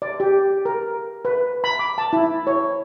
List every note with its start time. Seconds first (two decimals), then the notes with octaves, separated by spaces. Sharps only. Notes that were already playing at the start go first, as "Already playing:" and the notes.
0.02 D5
0.20 G4
0.65 A#4
1.25 B4
1.64 B5
1.79 D6
1.98 A5
2.13 E4
2.47 C#5